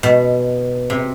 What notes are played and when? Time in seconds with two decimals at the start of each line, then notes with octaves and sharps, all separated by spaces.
0.03 B2
0.90 C3